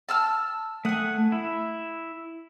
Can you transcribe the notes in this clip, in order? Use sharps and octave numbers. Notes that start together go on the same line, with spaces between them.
A5 E6 F6
A3 F#5 G#5 D#6
E4